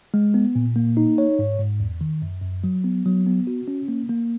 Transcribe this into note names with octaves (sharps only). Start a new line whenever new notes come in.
G#3
B3
A#2
A#3
D#4
C#5
G#2
G#2
E2
D#3
F#2
F#2
F#3
B3
F#3
B3
F#4
C#4
A#3
A#3